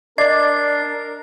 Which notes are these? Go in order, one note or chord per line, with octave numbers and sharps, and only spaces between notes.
D4 A#4 D5 D#5 D6 C7